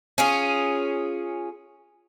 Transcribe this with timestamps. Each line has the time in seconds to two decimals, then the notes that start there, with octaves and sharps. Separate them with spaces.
0.18 C#4 F4 G#4